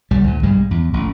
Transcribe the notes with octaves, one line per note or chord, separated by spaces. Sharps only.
B1 G3
D2 A#2
B1 G2 G3 G#3
E2
A1